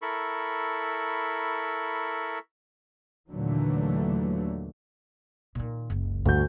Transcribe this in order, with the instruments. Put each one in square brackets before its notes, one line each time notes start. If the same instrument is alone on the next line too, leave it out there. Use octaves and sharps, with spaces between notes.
[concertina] E4 A4 A#4 B5 C#6
[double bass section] D#2 A#2 D3 E3 F#3 A3
[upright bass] A#2 D#3
F#1 C#2
[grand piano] D2 F#4 G6 [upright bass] G2